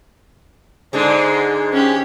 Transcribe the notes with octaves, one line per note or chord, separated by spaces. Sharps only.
G#2 D3 G#3 D4
C#4 G4